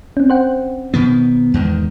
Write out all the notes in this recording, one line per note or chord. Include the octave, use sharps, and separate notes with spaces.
C4 C#4
C5 F#5 G5
B2 D#3 B3
E2 G#2 D#3